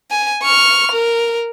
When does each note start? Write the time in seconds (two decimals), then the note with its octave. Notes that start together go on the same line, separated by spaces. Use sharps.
0.11 G#5
0.43 C#6 F6
0.92 A#4